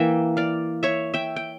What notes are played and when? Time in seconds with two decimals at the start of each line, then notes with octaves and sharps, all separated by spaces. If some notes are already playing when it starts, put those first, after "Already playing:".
Already playing: E3 A#3 E5 G5
0.37 D5 F5
0.83 C#5 E5
1.14 E5 G5
1.36 G5